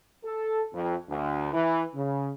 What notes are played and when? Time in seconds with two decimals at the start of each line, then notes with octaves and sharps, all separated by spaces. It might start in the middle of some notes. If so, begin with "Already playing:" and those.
0.24 A4
0.74 F2
1.09 D2
1.53 E3
1.95 C#3